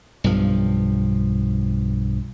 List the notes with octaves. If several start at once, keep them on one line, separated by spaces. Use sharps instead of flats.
B1 G2 F3